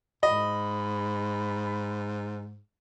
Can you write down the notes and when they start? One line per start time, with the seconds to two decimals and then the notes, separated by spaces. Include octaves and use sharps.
0.23 G#2 D#5 B5